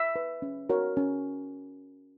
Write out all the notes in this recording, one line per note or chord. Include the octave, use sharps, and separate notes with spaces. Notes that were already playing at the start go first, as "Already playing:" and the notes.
Already playing: E5
B4
C#4
F#4 A#4 C#5
C#4